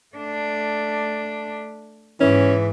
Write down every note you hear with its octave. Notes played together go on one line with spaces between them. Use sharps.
A3 D4
G#2 E3 C#4